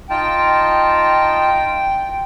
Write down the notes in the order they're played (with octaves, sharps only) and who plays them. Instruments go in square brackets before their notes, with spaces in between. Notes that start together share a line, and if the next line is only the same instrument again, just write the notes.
[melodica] D#4 F4 A5 [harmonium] G5